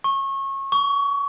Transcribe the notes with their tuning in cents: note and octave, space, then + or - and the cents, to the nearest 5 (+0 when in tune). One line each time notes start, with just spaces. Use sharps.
C#6 -25
C#6 +25